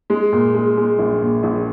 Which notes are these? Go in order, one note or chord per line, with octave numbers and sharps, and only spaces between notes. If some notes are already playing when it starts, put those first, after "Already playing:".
G#3
A#2
G#3
G#3
A#1
A#2
A#1